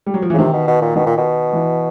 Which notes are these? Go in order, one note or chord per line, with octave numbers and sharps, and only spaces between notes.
G3
F#3
F3
E3
C#3
C3 D#3
B2
B2
A#2
B2 D#3
A#2
B2
E3